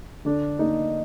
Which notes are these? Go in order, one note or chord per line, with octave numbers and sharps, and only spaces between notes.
D3 D4
A#3 D#4